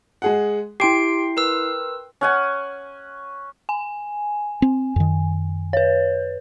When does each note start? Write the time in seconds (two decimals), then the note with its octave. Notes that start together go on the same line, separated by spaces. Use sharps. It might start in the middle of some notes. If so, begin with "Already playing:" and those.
0.22 G#3 G#4 F#5
0.80 E4 G4 G5 C6 C7 D7
1.37 A#4 B4 E6
2.21 C#4 F#5 G#5
3.69 G#5
4.62 C4
4.96 F#2 D#3
5.73 B4 C#5